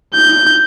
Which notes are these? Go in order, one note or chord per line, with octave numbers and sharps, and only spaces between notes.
G6